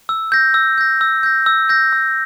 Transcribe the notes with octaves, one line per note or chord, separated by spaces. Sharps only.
E6
G6 A#6
E6
G6 A#6
E6
G6 A#6
E6
G6 A#6
E6